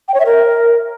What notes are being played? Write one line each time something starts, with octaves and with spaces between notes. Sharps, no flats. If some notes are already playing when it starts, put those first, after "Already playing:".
G5
C#5
E5
A#4